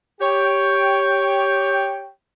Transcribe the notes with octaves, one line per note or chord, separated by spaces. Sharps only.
G4 C#5 G5